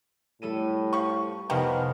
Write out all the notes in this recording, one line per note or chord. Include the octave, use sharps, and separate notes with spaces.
A2 G3 A4 D#7
F3 C#6
F1 C3 D#3 F3 G3 B3 F6